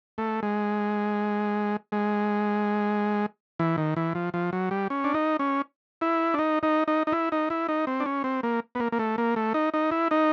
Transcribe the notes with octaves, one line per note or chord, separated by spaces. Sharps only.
A3
G#3
G#3
E3
D#3
E3
F3
F3
F#3
G3
C#4
D4
D#4
C#4
E4
D4
D#4
D#4
D#4
D#4
E4
D#4
E4
D#4
C4
D4
C#4
C4
A#3
B3
A#3
A#3
A3
A#3
A3
D#4
D#4
E4
D#4